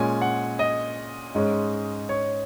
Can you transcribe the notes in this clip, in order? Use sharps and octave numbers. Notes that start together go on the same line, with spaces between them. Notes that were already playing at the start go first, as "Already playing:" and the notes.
Already playing: A#2 G#3 C#4 G#5
F#5
D#5
G#2 G#3 C#4
C#5